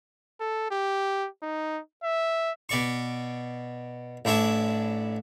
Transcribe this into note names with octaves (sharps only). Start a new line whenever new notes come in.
A4
G4
D#4
E5
B2 D5 C#6
A1 D4 E4 C#5 A5